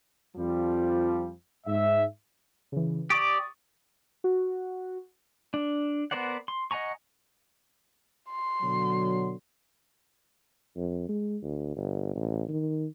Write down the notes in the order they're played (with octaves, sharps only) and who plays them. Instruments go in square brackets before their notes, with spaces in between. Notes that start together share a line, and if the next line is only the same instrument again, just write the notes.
[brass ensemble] F2 F3 G3
G#2 E5
[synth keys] C#3 E3
[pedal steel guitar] G4 D5 [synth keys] C#6 D#6 A6
[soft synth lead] F#4
[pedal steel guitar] D4
B3 A#4 C5 D5 F#5
C6
D#5 F#5 G#5 A#5 C#6
[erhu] C6
[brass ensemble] B2 D3 F#3
[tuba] F2
G#3
D2
G1
A1
D#3